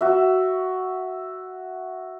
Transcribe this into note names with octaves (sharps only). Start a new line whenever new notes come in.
F#4 E5